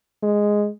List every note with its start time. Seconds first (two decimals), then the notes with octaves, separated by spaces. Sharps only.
0.23 G#3